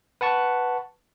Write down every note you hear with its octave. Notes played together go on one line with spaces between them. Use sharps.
B4 F#5 A5 C#6